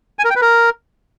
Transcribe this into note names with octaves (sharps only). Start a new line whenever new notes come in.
G#5
A#4
G5
B4
A#4